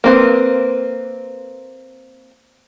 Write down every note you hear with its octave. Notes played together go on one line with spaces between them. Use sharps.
A#3 C4 B4